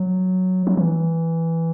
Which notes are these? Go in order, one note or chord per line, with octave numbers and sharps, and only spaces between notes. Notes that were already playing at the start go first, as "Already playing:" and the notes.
Already playing: F#3
F#3
E3